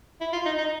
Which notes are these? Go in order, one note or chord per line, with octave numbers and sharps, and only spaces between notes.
E4
F4
D#4
D#4